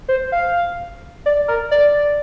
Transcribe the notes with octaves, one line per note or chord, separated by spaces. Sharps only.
C5
F5
D5
A#4
D5